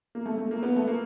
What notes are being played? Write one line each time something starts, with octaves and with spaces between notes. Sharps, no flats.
A#3
A3
A3
A#3
B3
A3
A#3